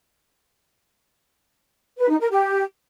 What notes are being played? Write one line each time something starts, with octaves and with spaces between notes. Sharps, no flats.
B4
D#4
A#4
G4